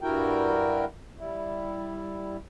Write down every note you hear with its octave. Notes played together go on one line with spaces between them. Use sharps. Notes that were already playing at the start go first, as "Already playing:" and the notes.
G2 G3 E4 F#4 A#4 G5
G3 E4